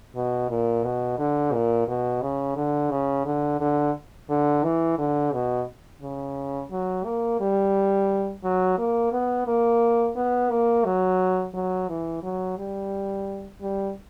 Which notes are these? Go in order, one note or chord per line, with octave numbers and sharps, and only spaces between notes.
B2
A#2
B2
D3
A#2
B2
C#3
D3
C#3
D3
D3
D3
E3
D3
B2
C#3
F#3
A#3
G3
F#3
A#3
B3
A#3
B3
A#3
F#3
F#3
E3
F#3
G3
G3